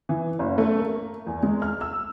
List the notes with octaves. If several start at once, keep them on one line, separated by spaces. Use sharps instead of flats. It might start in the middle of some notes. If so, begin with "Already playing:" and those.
E3
F#1
A3
A#3
E2
G#3
F6
E6